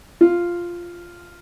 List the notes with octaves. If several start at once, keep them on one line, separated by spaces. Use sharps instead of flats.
F4